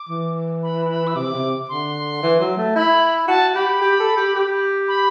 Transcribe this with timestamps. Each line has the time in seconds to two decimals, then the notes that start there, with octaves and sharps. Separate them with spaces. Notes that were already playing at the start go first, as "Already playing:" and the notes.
Already playing: D6
0.09 E3
0.63 B5
0.89 B5
1.07 E6
1.15 C3 D6
1.34 C3
1.69 D3 C6
2.23 E3
2.40 F#3
2.57 A3
2.75 E4 B5
3.28 F#4 A5
3.55 G4 B5
3.81 G4
4.00 A4
4.17 G4
4.35 G4
4.88 B5